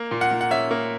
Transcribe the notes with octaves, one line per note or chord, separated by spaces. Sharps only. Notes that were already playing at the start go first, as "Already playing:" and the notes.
Already playing: A#3
A#2
F#5
A#2
F#5
C#4 E5
A#3